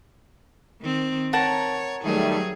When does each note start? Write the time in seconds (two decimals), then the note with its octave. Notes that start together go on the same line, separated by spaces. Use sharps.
0.81 D#3 C4
1.33 A#4 C#5 F#5 A5
2.04 D#3 F#3 G3 A3 G#4